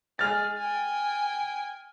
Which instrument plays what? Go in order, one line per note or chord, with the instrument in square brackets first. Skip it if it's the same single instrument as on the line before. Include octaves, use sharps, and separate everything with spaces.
[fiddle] G#3 [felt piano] F6 A6
[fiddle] G5 G#5